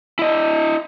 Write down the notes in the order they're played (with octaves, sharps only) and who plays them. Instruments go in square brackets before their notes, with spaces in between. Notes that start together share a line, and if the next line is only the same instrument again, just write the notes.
[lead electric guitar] E4 D#5